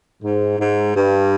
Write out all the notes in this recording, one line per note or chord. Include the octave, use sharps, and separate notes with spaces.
G#2
G#2
G2